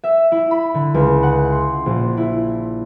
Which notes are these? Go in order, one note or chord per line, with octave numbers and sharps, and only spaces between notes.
E5
E4
B5
D3
C#2
F#5
C6
A#1
E4